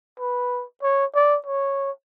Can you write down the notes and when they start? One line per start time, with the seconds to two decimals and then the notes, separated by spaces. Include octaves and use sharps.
0.20 B4
0.83 C#5
1.15 D5
1.46 C#5